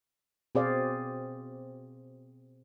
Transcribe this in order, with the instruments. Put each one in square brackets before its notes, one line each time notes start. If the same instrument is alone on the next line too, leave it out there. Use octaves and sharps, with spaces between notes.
[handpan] B2 C4 G#4 C5 D5 F5